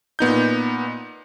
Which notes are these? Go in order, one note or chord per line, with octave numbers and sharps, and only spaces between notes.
A#2 B3 D#4 G6